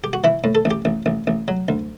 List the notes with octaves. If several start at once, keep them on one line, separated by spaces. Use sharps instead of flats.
G4
F#4
E3 E4
A2
A4
A1
G4
A1
A1
A1
F#3
D2